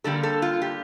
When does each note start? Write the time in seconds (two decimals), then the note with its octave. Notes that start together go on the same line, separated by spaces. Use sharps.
0.04 D3 G3 A#3 A4
0.23 A4
0.42 F4
0.62 G4